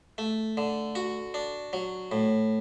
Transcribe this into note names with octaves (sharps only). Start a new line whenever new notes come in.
A3
D3
F#4
D4
F#3
A2